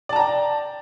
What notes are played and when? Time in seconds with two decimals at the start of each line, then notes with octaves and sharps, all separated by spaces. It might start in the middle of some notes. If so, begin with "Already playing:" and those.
0.09 D5
0.13 A5
0.16 A#5
0.19 G5